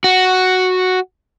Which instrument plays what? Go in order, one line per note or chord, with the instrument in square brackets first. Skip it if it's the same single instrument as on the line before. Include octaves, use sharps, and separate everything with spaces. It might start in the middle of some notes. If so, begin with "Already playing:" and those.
[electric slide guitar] F#4